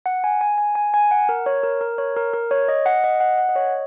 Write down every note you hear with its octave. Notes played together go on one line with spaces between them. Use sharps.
F#5
G#5
G#5
G#5
G#5
G#5
F#5
A#4
C#5
A#4
A#4
C#5
A#4
A#4
C#5
D#5
F#5
D#5
F#5
F#5
D#5
C#5